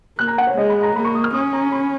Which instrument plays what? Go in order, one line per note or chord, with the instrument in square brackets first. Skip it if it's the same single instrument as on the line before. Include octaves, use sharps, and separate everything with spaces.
[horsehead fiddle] A#3 [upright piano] F#6
[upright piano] A#5
F#5
C#5
[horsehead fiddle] G#3 [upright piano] D#5
[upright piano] B5
A#5
[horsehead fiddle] A#3 [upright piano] B5
[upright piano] C#6
D#6
F6
[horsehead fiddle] C#4 [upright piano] D#6
[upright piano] A#5
B5